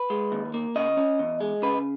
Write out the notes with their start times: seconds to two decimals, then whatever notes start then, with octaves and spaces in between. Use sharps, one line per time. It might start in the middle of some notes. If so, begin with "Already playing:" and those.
Already playing: B4
0.10 G#3
0.32 D#2
0.54 A#3
0.76 C#3 D#5
0.97 C#4
1.19 E2
1.41 G#3
1.62 C#3 B4